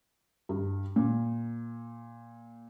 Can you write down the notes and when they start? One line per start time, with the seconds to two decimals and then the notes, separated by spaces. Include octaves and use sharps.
0.49 G2
0.96 A#2